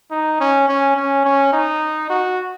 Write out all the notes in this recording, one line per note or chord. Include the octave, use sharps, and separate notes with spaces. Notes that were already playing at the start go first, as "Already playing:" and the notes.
D#4
C#4
C#4
C#4
C#4
D#4
F#4